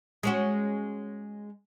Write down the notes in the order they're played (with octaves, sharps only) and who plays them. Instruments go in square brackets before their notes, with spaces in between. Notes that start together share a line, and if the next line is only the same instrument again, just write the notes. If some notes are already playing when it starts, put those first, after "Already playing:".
[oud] G#3 C#4 F#4